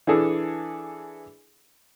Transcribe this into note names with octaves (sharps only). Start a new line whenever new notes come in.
E3 D4 G#4 A4